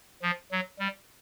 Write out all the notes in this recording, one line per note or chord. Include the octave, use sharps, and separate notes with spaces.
F3
F#3
G3